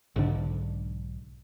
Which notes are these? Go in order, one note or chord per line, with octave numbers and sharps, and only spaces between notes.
B1 G#2 D3 D4